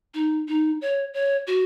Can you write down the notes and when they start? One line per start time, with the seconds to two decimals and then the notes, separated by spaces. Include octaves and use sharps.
0.14 D#4
0.48 D#4
0.81 C#5
1.14 C#5
1.47 F#4